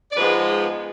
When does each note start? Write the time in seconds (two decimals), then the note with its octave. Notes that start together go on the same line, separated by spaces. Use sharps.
0.12 D5
0.16 G#2 F3 G#3 B3 B4